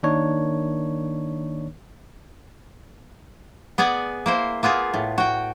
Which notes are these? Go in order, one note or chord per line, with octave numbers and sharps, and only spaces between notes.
D#3 A#3 D4 D#4 C#5
B3 G#4 D5 F#5 G#5
A#3 E4 C5
A#3 B3 F4 G#4
A2
F#4 G5